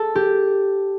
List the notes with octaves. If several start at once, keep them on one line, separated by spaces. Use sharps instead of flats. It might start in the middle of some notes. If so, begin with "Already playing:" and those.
Already playing: A4
G4